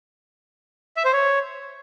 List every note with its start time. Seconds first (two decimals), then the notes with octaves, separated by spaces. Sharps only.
0.97 E5
1.05 C5
1.13 C#5